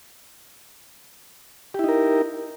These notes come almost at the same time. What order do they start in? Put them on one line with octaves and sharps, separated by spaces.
G4 E4 D#4 A#4